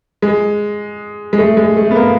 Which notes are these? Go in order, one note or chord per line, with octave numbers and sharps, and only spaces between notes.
G#3
G#3
A3
G#3
A3
B3
A#3